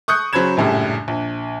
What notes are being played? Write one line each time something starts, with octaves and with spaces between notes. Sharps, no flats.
C#6 D#6 F#6 G6 C#7
C#3 F#3 C5 B5 G#6 E7
A#1 F#2 A2 C#3 G3
A#1